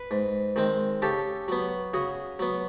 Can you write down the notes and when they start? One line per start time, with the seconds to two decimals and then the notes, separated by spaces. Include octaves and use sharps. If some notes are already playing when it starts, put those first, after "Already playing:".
Already playing: B4
0.11 G#2
0.56 D#3 G#3 C4
1.02 C#3 G4 A4
1.48 F#3 B3
1.94 C#3 F#4 G#4
2.39 F#3 B3